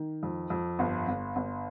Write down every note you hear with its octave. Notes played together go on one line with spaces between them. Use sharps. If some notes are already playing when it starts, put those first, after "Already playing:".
Already playing: D#3
F2
F2
G1
G1
G1